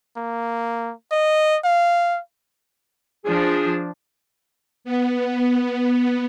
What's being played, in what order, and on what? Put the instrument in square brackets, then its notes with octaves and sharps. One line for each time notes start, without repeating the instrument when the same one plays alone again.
[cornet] A#3
D#5
F5
[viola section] F3 D4 [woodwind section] G#4
[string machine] B3